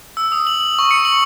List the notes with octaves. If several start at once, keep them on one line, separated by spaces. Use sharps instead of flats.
E6
D#6
F#7
F#7
C#6
C#7
F#7